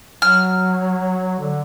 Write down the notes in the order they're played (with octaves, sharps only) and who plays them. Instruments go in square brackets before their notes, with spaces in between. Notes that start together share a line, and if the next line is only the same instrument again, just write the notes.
[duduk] F#3 [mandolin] F6
[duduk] D3